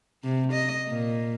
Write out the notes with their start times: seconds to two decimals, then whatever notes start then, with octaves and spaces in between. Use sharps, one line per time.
0.23 C3
0.53 D#5
0.88 A#2